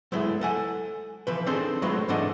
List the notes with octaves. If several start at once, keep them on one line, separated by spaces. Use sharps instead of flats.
F#3 G#3 A3 B3 E4
A4 F#5 G#5
E3 F3 B4
C4 D4 D#4 G#4 A4 C5
F#3 G#3 A3 F4 B4
G#2 E3 D4 A4 D#5 F#5